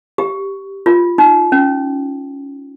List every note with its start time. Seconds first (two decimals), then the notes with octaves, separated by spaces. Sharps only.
0.18 G4
0.86 F4
1.18 D#4
1.52 C#4